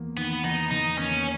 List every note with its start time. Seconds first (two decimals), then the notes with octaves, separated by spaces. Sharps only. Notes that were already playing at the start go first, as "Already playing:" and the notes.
Already playing: E2 A#3
0.17 D#3 B3
0.44 E2 D#4
0.71 E2 D#4
0.98 A#3 C#4